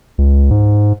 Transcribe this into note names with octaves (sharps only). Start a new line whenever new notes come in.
C#2
G#2